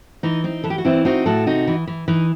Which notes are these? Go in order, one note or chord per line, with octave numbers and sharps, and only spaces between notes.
E3 D#4
C4 D#4
E3 A4
G4
F#4
E3 C4 E4
C4 D#4 F#4
A2 F#4 A4
C3 D#4 F#4
E3
E3
E3 D#4